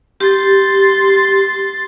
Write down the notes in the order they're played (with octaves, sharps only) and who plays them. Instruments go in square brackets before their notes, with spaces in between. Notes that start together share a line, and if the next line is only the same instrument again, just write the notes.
[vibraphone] G4 [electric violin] C6 A6